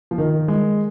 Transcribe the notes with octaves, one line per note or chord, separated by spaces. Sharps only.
F3
D#3
G#3